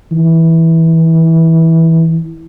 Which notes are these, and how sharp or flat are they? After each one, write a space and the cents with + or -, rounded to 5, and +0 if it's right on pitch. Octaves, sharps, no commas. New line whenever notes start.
E3 -15